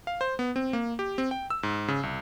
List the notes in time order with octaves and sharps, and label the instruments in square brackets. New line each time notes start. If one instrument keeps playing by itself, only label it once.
[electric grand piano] F5
C5
B3
C4
A#3
G4
C4
G5
E6
G#2
C#3
C2